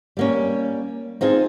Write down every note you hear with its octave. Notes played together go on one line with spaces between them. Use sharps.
G3 A#3 C#4
C4 D#4 F4 G#4